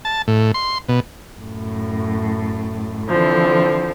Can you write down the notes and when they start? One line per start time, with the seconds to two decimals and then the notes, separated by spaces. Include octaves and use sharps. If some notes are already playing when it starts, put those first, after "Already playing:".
0.05 A5
0.28 A2
0.54 C6
0.89 B2
1.35 F#2 A2
3.07 D3 E3 F3 C4